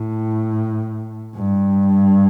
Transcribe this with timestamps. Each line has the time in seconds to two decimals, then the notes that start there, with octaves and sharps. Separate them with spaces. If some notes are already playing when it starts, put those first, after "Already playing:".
Already playing: A2
1.36 G2